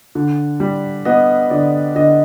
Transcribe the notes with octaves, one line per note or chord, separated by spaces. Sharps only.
D3
G3
B3 D#5
D3 D5
D3 D#5